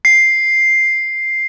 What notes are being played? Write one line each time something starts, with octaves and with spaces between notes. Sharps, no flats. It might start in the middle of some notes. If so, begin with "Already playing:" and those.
C7